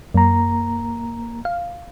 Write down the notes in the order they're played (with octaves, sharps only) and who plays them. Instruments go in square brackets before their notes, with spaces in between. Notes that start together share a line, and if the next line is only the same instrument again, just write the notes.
[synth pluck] F#2 [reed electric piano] A#3 A#5
[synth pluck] F5